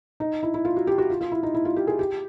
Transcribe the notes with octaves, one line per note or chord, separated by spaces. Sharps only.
D#4
E4
E4
F4
F#4
G4
F#4
F4
F4
E4
D#4
E4
F4
G4
G#4
G4